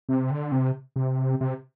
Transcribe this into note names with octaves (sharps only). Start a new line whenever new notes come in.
C3
D3
C3
C3
C3